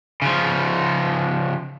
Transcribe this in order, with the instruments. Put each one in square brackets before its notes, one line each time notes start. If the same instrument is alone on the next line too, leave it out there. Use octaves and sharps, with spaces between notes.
[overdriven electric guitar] C#3 F3